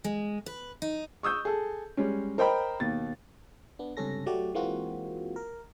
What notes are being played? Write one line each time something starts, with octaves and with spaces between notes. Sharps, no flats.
G#3
B4
D#4
C#6 D#6 E6 G6
G#4 A4
G3 G#3 C#4
A#4 C5 D#5 G5 A#5 B5
D#2 B2 A6
B3 D4
C#2 G2 C3 C#4 A4 A#6
F#3 A3 F#4 G4 D5
E3 G#3 A#3 C4 F4 F#4
A#4